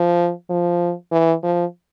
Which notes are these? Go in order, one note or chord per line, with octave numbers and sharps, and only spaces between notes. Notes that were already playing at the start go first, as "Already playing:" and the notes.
Already playing: F3
F3
E3
F3